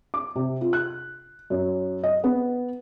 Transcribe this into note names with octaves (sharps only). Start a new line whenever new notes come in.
D6
C3
F4
F#6
F#2
D#5
B3